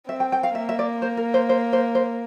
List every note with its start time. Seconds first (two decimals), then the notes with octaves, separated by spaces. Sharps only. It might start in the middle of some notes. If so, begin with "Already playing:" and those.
0.09 C4 E5
0.20 G5
0.32 G5
0.43 F5
0.55 A#3 E5
0.69 E5
0.79 D5
1.02 C5
1.17 A#4
1.34 C5
1.49 C5
1.73 C5
1.95 C5